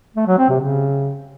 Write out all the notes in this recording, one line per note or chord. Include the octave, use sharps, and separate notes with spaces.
A3
F#3
C4
C3
C#3